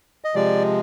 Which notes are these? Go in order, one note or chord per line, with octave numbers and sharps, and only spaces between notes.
D#5
C3 F3 G#3 D5